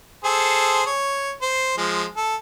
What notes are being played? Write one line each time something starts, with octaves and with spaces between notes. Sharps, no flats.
G#4 A4 C5
C#5
C5
F3 G#3
A4